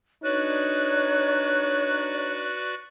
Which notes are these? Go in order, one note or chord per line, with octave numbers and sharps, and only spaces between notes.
D4 D#4 F#4 B4 C#5 D5 F#6